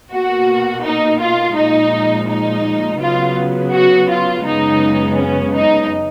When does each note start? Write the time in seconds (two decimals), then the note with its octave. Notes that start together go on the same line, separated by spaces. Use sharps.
0.11 B2 A#3 F#4
0.84 D#4
1.20 F4
1.56 A#2 F3 G#3 D#4
2.29 D#4
3.01 C#3 F#3 B3 F4
3.73 F#4
4.10 F4
4.46 F#2 C#3 G#3 B3 D#4
5.18 C#4
5.55 D#4